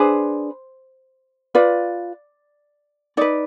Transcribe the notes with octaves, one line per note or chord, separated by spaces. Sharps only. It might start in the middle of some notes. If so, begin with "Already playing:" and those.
Already playing: D4 G#4 B4 C5
F4 B4 D5
D#4 B4 D5